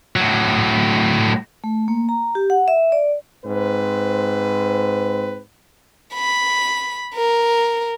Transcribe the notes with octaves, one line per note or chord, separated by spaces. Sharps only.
A2 F#3
A3
A#3
A#5
G4
F#5
E5
D5
G#2 C4 B4
B5
A#4